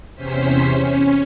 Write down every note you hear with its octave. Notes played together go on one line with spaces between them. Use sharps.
E2 C3 C#4 C5 B6
C#4